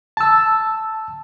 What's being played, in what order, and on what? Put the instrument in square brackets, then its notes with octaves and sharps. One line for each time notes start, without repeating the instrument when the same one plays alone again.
[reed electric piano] A5 E6